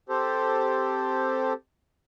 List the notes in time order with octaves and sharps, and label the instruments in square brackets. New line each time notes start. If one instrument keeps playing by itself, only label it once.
[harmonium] C4 G4 A4 C5